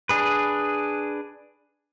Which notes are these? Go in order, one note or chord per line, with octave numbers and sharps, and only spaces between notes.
D4 G#4 B4